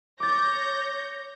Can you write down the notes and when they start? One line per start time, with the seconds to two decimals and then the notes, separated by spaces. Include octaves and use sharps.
0.20 C#5 D6 G6 A6 A#6